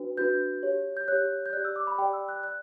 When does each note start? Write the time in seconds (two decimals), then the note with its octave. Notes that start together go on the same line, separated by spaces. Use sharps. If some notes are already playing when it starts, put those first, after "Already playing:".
Already playing: D4 F#4 B4
0.17 D4 F#4 B4 G6
0.63 G4 C#5
0.97 G6
1.08 G4 C#5 F#6
1.46 G6
1.53 G4 D5 F#6
1.65 E6
1.76 D6
1.87 B5
1.98 G4 D5 G5
2.13 E6
2.29 F#6
2.43 D5 F#6